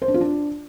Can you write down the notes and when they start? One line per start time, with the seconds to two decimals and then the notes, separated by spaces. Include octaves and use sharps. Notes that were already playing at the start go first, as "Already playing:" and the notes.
0.02 C5
0.08 D4
0.14 F4
0.21 D4